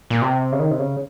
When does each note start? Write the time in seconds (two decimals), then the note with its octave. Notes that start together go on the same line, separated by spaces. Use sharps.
0.10 A#2
0.22 C3
0.52 C#3
0.59 D#3
0.71 C3
0.79 C#3